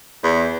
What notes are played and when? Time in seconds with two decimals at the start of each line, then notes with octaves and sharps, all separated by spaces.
0.24 E2